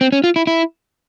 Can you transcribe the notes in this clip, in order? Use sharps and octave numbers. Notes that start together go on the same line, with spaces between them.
C4
C#4
F4
E4
E4